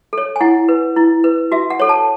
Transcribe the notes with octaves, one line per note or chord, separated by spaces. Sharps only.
A4 C#5
G#5
E4 F#5
B4
E4
B4
F#4 E5
F#5
A4 C#5
A5